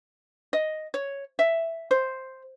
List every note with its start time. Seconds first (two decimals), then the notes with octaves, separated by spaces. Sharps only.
0.53 D#5
0.94 C#5
1.39 E5
1.91 C5